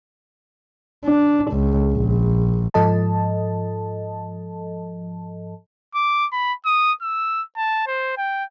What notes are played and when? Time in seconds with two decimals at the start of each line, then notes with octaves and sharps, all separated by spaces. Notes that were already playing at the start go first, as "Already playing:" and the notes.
1.04 D4
1.52 C#2
1.93 A#1
2.74 G#2 F3 A4 D#5 A5
5.95 D6
6.32 B5
6.65 D#6
7.02 E6
7.57 A5
7.87 C5
8.18 G5